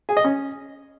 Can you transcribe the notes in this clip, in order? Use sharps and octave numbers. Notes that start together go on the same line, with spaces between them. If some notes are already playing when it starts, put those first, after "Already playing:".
G#4
D#5
C#4